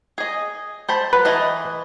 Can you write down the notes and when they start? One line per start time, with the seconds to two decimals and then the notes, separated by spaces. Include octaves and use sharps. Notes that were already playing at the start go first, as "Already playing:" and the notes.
0.18 G#4 D#5
0.89 C5 A5 B5
1.13 F#3 B4
1.25 E3 D#5 A5